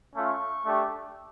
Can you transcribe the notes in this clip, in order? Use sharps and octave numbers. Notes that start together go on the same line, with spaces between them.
A3 C#4 F4 C#6
A3 D4 G4